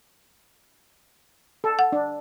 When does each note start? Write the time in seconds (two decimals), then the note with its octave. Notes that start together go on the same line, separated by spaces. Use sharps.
1.64 A4
1.79 F#5
1.92 D4